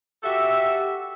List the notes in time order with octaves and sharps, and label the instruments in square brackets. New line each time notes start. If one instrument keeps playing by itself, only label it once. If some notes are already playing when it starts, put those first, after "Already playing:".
[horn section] F#4 G4 A4 E5